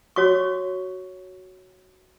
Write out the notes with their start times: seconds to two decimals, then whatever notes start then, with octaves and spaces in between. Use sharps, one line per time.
0.16 F#4 C#5 C#6